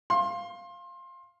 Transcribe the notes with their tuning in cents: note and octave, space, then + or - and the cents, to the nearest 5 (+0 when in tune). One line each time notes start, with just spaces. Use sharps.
F5 +0 C6 +25